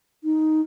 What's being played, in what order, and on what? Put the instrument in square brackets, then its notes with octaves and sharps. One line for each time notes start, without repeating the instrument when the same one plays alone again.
[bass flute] D#4